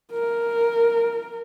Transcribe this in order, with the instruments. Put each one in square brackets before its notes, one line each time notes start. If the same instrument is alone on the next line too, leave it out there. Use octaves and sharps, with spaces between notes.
[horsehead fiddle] A#4